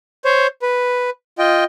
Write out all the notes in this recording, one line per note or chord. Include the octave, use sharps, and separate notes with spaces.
C5 C#5
B4
F4 D#5 G5